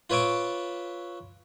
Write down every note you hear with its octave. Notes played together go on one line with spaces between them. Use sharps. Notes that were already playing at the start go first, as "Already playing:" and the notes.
F4 B4 C#5 E5 D6